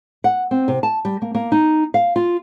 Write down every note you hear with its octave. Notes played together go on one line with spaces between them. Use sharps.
F#5
C4
C3
A5
G3
A#3
A#3
D#4
F5
F4